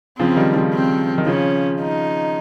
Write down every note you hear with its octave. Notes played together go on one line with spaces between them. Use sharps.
C#3 F3 C4
D#3 G3
C#3 F3
C4
D#3
C#3 F3 C#4
D#4